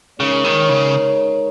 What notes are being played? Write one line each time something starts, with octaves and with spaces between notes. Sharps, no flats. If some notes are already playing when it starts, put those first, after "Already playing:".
C#3 G#3 D#4 A#4 C#5
D#3
C#3